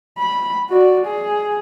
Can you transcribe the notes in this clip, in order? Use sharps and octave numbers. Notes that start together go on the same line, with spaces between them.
B5
F#4 D5
G#4